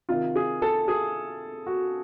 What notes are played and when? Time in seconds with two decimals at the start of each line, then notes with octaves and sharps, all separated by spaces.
0.09 C3 D#3 F4
0.36 G#4
0.62 A4
0.88 G#4
1.67 F#4